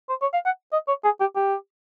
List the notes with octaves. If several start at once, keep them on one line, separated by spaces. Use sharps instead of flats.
C5
C#5
F5
F#5
D#5
C#5
G#4
G4
G4